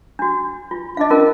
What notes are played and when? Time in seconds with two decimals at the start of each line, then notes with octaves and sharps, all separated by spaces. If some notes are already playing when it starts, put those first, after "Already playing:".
0.19 D4 F#4
0.71 F4
0.97 D4 D#5 F5
1.10 C#4 F4 A#4